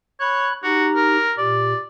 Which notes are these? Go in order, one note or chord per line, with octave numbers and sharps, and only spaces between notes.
C#5 B5 F#6
D#4 F#4 G4 A#5
A#4
A#2 G4 D5